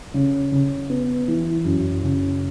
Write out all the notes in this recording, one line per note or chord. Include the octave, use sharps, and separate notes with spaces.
C#3
C#3
B3
E3
F#2
C#3